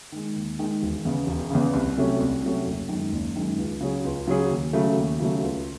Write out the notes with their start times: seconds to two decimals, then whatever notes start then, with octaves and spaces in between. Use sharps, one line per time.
0.12 D#3 G#3
0.36 D#2
0.59 D#3 G#3
0.82 E1
1.05 E2 C#3
1.27 E1
1.50 E2 C#3
1.73 C2
1.97 C3 F#3 A3 C#4
2.20 C2
2.43 C3 F#3 A3 C#4
2.66 F#1
2.89 F#2 D#3 G#3
3.12 F#1
3.36 F#2 D#3 G#3
3.58 C#2
3.80 C#3 F#3 C#4 G#4
4.04 C#2
4.27 C#3 F#3 C#4 G#4
4.49 D#2
4.73 C#3 F#3 A3
4.96 D#2
5.19 C#3 F#3 A3
5.43 C#2